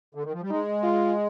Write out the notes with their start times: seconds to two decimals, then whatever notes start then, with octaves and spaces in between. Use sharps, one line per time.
0.15 D3
0.24 D#3
0.33 F3
0.42 G3
0.50 G#3 D#4
0.83 F4